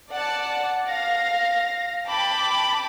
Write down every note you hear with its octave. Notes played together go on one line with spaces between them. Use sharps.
D5 F#5 A5
F5 A#6
G5 A5 B5 D6